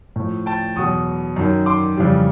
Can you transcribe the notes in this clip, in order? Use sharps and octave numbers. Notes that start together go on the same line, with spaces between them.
A2 F3
G5 A5
E2 B2 F#3 C#6 D#6
F#2 D#3 F#3
C6 D6
F2 C#3 E3 G3